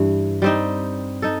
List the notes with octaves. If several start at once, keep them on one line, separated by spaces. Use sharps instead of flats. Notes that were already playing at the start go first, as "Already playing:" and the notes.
Already playing: G2 E3
G3 C4 D#4
D#4 A4